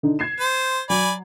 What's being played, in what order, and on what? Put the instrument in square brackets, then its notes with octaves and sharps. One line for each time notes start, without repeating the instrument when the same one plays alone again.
[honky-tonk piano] D3 D#4
G#6 C7 E7
[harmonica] C5
[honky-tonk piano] F#3 [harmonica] D5 G#5 B5